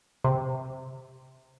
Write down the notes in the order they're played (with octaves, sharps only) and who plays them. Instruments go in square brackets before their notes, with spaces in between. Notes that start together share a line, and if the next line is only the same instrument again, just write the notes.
[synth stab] C3